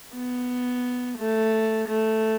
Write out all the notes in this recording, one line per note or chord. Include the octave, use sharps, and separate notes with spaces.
B3
A3
A3